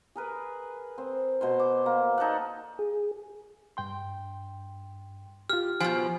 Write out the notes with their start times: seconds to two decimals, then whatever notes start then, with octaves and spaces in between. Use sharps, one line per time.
0.15 G#4 A#4 B4
0.98 C4
1.41 B2 C5 C6
1.60 D6
1.86 A#3
2.18 D#4 A4 D5 F#5
2.79 G#4
3.77 G2 G5 C6
5.50 F4 G4 F6
5.80 B2 F3 G#5